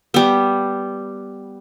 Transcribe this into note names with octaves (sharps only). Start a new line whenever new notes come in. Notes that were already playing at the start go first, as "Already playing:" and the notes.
G3 B3